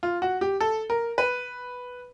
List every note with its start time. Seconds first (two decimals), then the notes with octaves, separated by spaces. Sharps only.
0.03 F4
0.22 F#4
0.41 G4
0.60 A4
0.90 A#4
1.18 B4